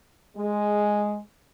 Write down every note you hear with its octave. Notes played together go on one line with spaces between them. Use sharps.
G#3